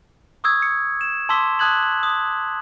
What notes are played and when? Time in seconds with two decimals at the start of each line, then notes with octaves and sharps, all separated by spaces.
0.44 C#6 D#6 E6 G#6
0.62 C#7
1.01 E7
1.29 A5 C6 D6 E6 B6 G7
1.59 A5 D#6 F#6 G#6 F#7
2.03 D#6